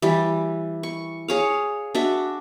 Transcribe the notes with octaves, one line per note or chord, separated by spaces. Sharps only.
E3 G3
C#6
G#4 C#5 F5
D4 F#4 E5